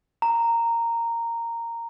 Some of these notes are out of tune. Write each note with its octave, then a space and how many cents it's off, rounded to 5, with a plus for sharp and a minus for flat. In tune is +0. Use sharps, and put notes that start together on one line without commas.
A#5 -10